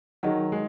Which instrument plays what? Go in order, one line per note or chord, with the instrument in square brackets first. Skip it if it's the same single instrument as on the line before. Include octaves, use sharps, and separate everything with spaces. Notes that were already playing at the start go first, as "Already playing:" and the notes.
[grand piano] D#3 F#3 [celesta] D#4 G#4 D#5 F#5
[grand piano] G#3